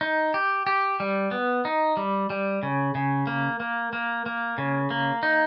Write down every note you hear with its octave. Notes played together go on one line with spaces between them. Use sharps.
D#4
G4
G4
G3
B3
D#4
G3
G3
C#3
C#3
A#3
A#3
A#3
A#3
C#3
A#3
D#4